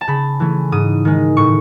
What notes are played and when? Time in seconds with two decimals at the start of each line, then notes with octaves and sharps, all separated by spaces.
0.01 A5
0.08 C#3 B5
0.40 E3 A3 C#4
0.72 G#2 D#6
1.05 D#3 G#3
1.37 A2 C#6